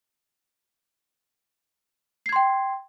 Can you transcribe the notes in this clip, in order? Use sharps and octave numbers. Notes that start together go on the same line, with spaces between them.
G5 C6 G#6 C7